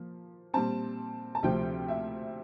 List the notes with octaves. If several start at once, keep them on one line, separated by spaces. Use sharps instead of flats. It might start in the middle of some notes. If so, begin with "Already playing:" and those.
Already playing: F3 A#3
A#2 G3 C4 A5
A5
D2 C3 F3 C4 G5
E5